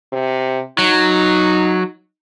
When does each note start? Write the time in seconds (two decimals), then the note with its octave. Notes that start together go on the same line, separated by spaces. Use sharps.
0.12 C3
0.79 F#3 D#4